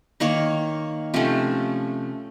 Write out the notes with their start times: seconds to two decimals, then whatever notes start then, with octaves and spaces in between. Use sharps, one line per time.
0.20 D#3 A#3 D#4 C#5
1.14 C3 F3 A3 C#4